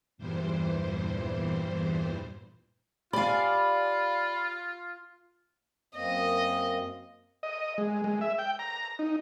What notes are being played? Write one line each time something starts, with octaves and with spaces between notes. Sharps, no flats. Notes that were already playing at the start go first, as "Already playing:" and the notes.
E2 G2 A#2 E3 G3 C5
F4 G4 D5 F5 G#5 B5
F#2 A#3 C4 D#5
D#5
G#3
G#3
E5
G5
A#5
D#4